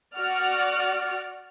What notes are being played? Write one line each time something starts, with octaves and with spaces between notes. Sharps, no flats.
F#4 D5 F6